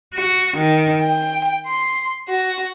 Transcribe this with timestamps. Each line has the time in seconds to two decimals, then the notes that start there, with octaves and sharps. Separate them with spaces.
0.15 F#4
0.57 D#3
1.03 G5
1.67 C6
2.29 F#4